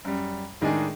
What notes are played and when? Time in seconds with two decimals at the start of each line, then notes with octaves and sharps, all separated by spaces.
0.05 F#2 G3
0.61 A2 D#3 G#3 D4 D#4 G#4